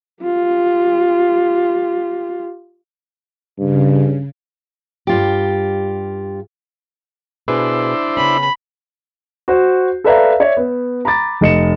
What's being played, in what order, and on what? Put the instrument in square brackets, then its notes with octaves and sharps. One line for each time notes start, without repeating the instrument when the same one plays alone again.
[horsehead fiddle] F4 G4
[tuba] G2 [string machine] C#3
[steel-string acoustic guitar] G2 F4 G4
[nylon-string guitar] B2 G#4 B4 [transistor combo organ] D4 E4 C5
[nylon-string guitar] C#3 B3 C#4 [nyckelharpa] B5
[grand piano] F#4 C5
A4 B4 D5 E5 F5 A#5
C#5 D5 E5
B3
A#5 B5 D6 A6
F1 D#5 C#7 E7